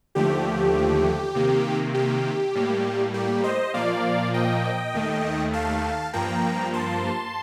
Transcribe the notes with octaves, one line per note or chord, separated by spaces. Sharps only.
D#2 D3 F3 A3 G4
C3 D#3 A#3
G4
A2 G3 A#3
G4
C5 D#5
A#2 F3 A#3 D5 F5
D#5 G5
D#2 D#3 A3
F5 A5
G2 F3 A#3 G5 A#5
A5 C6